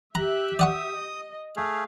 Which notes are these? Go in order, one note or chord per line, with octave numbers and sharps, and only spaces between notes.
G4 E5 A#5 F#6
D5 F#5 C#6 D#6
D#5
A3 G#4 F5